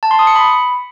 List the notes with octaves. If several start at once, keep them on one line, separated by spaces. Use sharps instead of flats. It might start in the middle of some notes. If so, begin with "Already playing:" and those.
A5
C6
D#6
C#7
B5